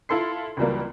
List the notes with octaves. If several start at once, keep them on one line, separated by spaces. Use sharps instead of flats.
E4 F4 A4 C6 C7
C#2 E3 F#3 G3 A#3